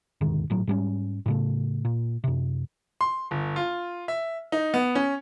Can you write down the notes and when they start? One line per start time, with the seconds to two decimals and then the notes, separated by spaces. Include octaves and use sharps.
0.21 E1 D2 G#2 D#3
0.50 G#1 A2 F#3
0.67 G#2 G3 C#4
1.26 A2 C#3 A3
1.85 A#2
2.24 F#2 C3
3.01 C6
3.31 G1
3.56 F4
4.08 E5
4.52 D#4
4.74 B3
4.95 C#4